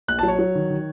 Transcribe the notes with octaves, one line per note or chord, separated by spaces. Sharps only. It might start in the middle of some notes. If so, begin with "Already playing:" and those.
A#1 F#6
A5
F#3
C#5
F#3
D#3
D#3